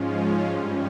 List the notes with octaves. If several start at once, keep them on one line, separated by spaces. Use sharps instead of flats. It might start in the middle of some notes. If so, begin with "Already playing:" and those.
Already playing: G#2 F3 G#3 C#4 F4
G2 G3 C#4